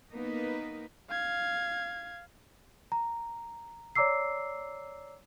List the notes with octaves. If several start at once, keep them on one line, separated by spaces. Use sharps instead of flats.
A#3 B3 D#4 A#4 B4
F5 G#6
A#5
C#5 D5 A#5 D6 E6 C7